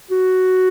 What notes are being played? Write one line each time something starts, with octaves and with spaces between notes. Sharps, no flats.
F#4